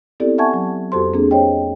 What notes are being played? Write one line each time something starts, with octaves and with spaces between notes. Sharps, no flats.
B3 C4 E4 G4 A4 D5
E5 F#5 G#5 A5 C#6 G#6
F#3
F2 F#4 G4 A4 C5 C6
A#3 C4 D4 G#4
C5 C#5 D#5 G5